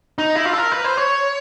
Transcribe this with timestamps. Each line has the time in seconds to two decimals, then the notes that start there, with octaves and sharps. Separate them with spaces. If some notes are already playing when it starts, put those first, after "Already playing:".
0.18 D#4
0.35 E4
0.45 F4
0.53 A4
0.58 A#4
0.72 B4
0.85 C5
0.98 C#5